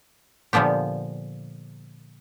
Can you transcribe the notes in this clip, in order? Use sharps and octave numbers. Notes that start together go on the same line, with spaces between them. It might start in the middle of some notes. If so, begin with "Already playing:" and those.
A#2 D3 F3 B3 G4